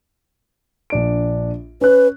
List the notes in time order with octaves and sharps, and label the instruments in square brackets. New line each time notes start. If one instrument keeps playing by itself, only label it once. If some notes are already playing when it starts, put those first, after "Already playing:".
[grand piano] A#1 D4 D7
[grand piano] C#4 F#6 [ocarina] B4